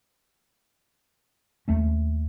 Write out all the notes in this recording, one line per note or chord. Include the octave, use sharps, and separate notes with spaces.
D#2 A3 C#4